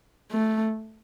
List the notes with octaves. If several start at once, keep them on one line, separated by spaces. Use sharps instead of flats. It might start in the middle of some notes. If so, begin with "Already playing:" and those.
A3